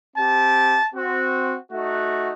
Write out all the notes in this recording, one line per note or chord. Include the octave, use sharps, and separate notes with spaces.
C4 G4 A5
C4 F#4
A3 D#4 F#4